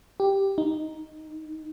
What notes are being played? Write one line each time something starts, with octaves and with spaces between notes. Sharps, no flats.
G4
D#4